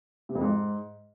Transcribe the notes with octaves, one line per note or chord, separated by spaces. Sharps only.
C3
F2
G#2